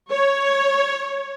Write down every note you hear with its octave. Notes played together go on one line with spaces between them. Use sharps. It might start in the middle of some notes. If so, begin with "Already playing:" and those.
C#5